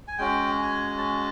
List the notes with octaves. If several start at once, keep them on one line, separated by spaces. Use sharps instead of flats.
G#5
G#3 C#4 F#4 G5
G#5
A5